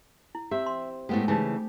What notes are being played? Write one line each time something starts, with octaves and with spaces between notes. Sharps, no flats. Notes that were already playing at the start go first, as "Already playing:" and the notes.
E4
C4 G4 E5
C6
A2 G#3 A3 B3 G4
C#3 E3 D#4 G4 G#5